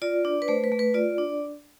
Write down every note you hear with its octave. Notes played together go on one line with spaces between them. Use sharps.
F4 D5
D4
B4
A3 C5
B4
A3
B4
F4 D5
D4